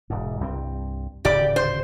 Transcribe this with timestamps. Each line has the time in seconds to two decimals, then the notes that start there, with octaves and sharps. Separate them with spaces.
0.10 E1 G#2
0.41 C2 G2 C4
1.25 D1 G#1 C#3 G4 D5
1.56 C5